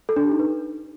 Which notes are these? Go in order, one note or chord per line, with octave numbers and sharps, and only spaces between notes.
A4
D4
G4
D#4
B4